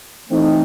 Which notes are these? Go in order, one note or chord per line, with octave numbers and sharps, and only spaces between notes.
E3 A3 C4 D#4